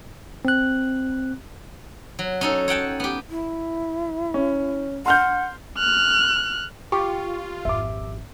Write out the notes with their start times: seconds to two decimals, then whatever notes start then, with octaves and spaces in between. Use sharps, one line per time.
0.45 C4 F#6
2.19 F#3
2.41 C#4 D#4 A4
2.68 C#5 F#5 G5 A5
3.00 B3 G4
3.30 E4
4.34 C#4
5.06 F#5 C6 F6 G6
5.78 F6 F#6
6.92 F4 G4 C#6
7.65 G#1 F2 E5 D6